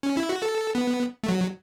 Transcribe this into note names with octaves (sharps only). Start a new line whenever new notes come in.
C#4
E4
F#4
A4
B3
A3
F#3